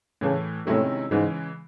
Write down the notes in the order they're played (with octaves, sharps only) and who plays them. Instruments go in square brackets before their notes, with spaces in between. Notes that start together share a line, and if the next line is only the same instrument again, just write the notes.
[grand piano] A2 E3 A3 [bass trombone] C#3
[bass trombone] A2 [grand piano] C3 D#3 G#3 C#4 E4
[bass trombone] G#2 [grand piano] C#3 E3 G#3